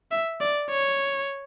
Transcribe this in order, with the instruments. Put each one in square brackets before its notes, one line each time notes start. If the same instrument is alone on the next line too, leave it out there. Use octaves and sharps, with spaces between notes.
[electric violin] E5
D5
C#5